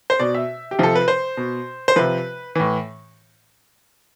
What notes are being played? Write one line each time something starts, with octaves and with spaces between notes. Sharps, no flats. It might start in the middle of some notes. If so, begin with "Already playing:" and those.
C5
B2 D5
E5
G4
C3 F3 A4
B4
C5
B2
C5
C3 F3 B4
A2 E3